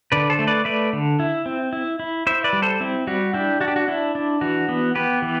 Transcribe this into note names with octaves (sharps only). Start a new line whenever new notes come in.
D3 B4 D5
A4 C5
A3
B4 D5
A3 B4 D5
D3
E4
C4
E4
E4
E4 C5 E5
B4 D5
G3
A4 C5
C4 E4
G3 F#4
D4 E4 G4
D4 F#4
G4
F#4
D4 E4
D4
E3 F#4
B3
B3 G4 B4
E3